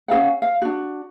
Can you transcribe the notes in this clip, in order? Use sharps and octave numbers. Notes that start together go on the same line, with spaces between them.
C#4 G#4 F5 F#5
F5
D4 F#4